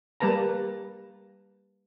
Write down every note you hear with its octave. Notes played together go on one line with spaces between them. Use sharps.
G3 A#3 B4 A5 A#5